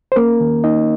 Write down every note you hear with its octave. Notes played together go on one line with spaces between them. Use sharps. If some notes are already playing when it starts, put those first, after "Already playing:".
C5
A#3 C#4 A#4
D#3
A#3 D#4 D#5